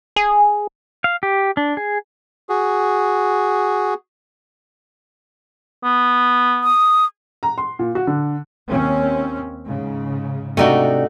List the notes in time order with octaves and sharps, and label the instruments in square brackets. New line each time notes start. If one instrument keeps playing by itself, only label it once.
[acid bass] G#4
[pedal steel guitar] F5
G4
D4
G#4
[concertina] F#4 G#4
[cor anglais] B3
[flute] D#6
[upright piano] A#5
C6
A#2
F#4
D3
[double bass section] D#2 C4 C#4
G#2 C#3
[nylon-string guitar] C3 D4 D5 [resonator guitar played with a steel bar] A3 D#4 F#4